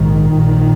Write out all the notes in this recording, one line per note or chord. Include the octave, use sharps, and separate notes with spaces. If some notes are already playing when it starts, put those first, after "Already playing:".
Already playing: A#1 G#2 D#3
A#1 A#2